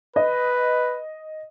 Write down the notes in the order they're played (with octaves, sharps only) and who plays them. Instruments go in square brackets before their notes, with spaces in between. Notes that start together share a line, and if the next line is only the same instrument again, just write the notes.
[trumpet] B4 [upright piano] D#5